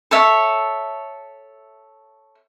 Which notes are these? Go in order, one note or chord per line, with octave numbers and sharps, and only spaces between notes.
A4 C#5 E5